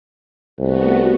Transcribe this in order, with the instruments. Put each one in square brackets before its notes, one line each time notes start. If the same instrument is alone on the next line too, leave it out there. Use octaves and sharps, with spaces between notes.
[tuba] C2 [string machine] A3 B3 F#4